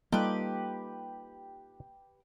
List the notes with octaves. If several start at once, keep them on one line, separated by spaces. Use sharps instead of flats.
G3 A#3 D#4 F4 G4 A4 B4